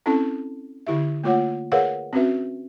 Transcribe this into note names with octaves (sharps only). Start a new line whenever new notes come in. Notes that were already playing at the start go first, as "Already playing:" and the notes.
C4 C#4 E4 A4 A5
D3 E4 G4 E5
A3 A#3 F4 C#5 F#5
G#4 A#4 B4 C#5 F5 F#5
C4 C#4 F#4 B4 E5